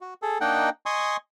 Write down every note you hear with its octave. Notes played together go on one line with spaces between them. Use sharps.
F#4
G#4 A4
A#3 D4 D#4 D#5 F#5 G5
D#5 G#5 C6 C#6 D#6